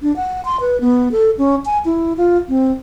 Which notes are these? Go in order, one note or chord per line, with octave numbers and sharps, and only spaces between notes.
D4
F#5
C6
B4
B3
A4
C#4
G#5
E4
F4
C4